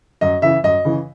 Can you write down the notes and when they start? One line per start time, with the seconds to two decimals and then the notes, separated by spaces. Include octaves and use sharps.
0.21 F#2 D#5
0.42 C#3 E3 E5
0.64 F#2 D#5
0.85 C#3 E3